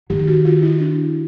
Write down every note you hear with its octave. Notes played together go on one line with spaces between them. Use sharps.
D#3 G4
F#4
F4
E4
D4